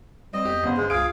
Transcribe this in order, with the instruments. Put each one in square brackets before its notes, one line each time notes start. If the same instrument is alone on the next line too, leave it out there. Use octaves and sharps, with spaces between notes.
[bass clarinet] G3 [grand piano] C4 [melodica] D#5
[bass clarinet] E2 [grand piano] G4
[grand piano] G1 C#3 C5 [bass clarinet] B3
[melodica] G#3 [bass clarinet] G#4
[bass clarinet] C#2 [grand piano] F4 D7 [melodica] G#4 F5